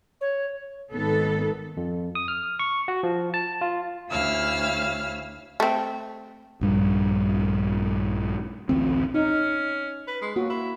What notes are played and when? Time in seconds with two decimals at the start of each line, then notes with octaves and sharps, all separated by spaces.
0.21 C#5
0.93 G#1 D#3 B3 A4
1.77 F2
2.15 D#6
2.28 F6
2.59 C#6
2.88 F#4
3.03 F3
3.34 A5
3.61 F4
4.09 D2 C#4 E4 F5 E6 F6
5.60 A3 C4
6.61 A#1 G2 G3
8.69 A1 D2 C4
9.14 C#4 D#4
10.07 B4
10.21 G#3
10.36 F#3 A#3 F#4
10.50 E4